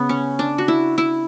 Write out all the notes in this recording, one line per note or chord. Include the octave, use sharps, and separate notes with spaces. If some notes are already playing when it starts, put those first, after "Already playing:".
Already playing: C#3 B3
C#4
D4
F#4
E4
E4